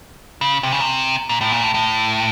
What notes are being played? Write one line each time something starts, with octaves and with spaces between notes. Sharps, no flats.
C#3
C3
C#3
C3
A#2
A2
A#2
A2
A2